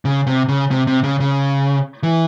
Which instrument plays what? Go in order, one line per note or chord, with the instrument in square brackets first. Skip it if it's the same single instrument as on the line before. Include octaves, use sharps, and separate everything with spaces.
[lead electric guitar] C#3
C3
C#3
C3
C3
C#3
C#3
E3